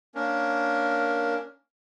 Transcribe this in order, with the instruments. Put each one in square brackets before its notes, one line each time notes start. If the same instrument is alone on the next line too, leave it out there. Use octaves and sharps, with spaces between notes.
[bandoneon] A#3 C#4 D4 A#4